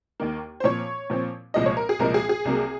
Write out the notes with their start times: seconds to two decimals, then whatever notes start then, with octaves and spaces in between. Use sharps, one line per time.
0.20 D#2 D#3 A#3
0.60 C5
0.64 A#2 F3 C4 C#5
1.10 A#2 F3 C4
1.54 C2 A#2 F3 G#3 D#5
1.66 C#5
1.77 A#4
1.89 G#4
1.99 C2 A#2 F3 G#3 A#4
2.14 G#4
2.29 G#4
2.45 C2 C3 F#3 A#3